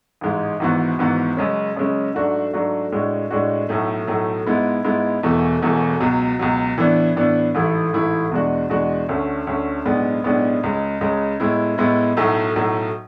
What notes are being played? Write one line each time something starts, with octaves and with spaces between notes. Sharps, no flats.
A1 G#2 G#3
G#1 G#2 E3 B3 F#4
G#1 G#2 E3 B3 F#4
F#2 C#3 G#3 C#4
F#2 C#3 G#3 C#4
G#2 F#3 A3 D4 F#4
G#2 F#3 A3 D4 F#4
A2 G#3 D4 F#4
A2 G#3 D4 F#4
B1 A2 F#3 A3
B1 A2 F#3 A3
G#2 G#3 B3 E4
G#2 G#3 B3 E4
E1 E2 B2 A3
E1 E2 B2 A3
C#2 B2 F#3
C#2 B2 F#3
A2 E3 B3 D4
A2 E3 B3 D4
A1 G#2 E3 A3 E4
A1 G#2 E3 A3 E4
E2 B2 G#3 D4 F#4
E2 B2 G#3 D4 F#4
D2 D3 A3 C#4
D2 D3 A3 C#4
B1 A2 G#3 B3 D4
B1 A2 G#3 B3 D4
C#2 C#3 G#3
C#2 C#3 G#3
A2 G#3 B3 E4
A2 G#3 B3 E4
B1 A2 F#3 A3
B1 A2 F#3 A3